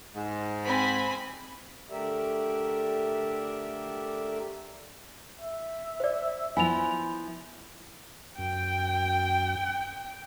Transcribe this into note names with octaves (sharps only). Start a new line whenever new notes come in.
G#2
C4 G#5 B5
D3 A3 G4 A#4 D5 E5
E5
C5 D5
F3 B3 E4 G#5 F7
F#2 G5